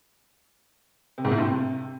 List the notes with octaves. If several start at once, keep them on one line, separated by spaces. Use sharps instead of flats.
C3
G#2
A2
G2
C3